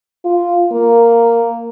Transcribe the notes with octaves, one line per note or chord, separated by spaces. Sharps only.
F4
A#3